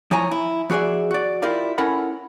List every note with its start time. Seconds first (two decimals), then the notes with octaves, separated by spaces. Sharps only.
0.11 F3 E4 C#5 G#5 A#5
0.31 E4
0.70 F3 F#4 G#4 D5 E5
1.11 F#4 D5
1.42 E4 F4 G4 A#4 D5 F5
1.78 C#4 E4 A4 A#4 F#5 B5